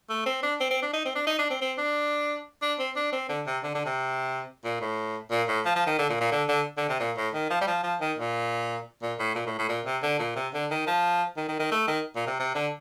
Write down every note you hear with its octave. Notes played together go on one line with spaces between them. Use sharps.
A3
C4
D4
C4
C4
D4
D#4
C4
D4
D#4
D4
C4
C4
D4
D4
C4
D4
C4
D3
C3
D3
D3
C3
A#2
A2
A#2
A2
F3
F3
D#3
D3
A#2
A#2
D3
D3
D3
C3
A#2
A2
D#3
F3
G3
F3
F3
D#3
A#2
A#2
A2
A#2
A2
A2
A#2
C3
D3
A#2
C3
D3
D#3
F3
D#3
D#3
D#3
A3
D#3
A#2
C3
C3
D3